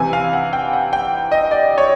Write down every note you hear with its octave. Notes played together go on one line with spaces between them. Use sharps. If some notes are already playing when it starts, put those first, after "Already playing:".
Already playing: C3 E3 G#5
F5
F#5
G5
F#5
G5
D#5
D5
C#5